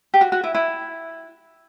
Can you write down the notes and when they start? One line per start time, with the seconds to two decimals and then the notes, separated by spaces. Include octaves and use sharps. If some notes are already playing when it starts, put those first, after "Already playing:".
0.14 G4
0.21 F#4
0.32 F#4
0.44 E4
0.55 E4